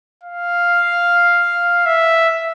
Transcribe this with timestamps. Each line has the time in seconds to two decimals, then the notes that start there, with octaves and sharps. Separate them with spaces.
0.24 F5
1.86 E5